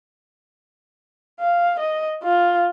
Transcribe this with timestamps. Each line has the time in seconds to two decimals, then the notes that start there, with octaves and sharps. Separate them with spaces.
1.40 F5
1.80 D#5
2.23 F4